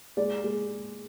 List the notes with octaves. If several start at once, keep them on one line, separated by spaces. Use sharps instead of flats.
G#3 D5
G#3